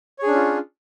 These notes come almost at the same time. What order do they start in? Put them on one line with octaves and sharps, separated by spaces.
C#5 G#4 D4 C#4 F4